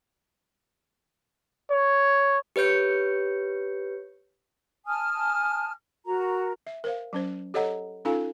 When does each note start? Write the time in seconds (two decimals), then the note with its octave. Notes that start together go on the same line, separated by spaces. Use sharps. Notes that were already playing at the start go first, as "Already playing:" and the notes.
1.71 C#5
2.56 G4 B4 C#5 G6 C#7
4.86 G#5 A5 D#6 F6
6.06 F#4 A#4 A#5
6.67 E5
6.84 A#4 C5 F5
7.13 F#3 C#4 C5
7.54 G4 A4 C#5 D#5 F#5 A#5
8.05 C#4 D#4 F4 A4 F5 G#5